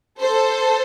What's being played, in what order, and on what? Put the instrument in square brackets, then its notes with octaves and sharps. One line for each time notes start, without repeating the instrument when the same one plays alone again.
[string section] A4 C5